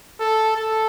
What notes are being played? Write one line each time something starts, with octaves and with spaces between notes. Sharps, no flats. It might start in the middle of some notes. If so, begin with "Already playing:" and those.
A4
A4